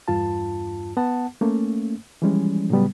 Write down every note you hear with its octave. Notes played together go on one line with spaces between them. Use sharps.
E2 G2 F4 A5
B3 F#5 A5
A3 A#3 C#4
E3 F3 G3 G#3 C#4
A2 C#3 F#3 G3 B3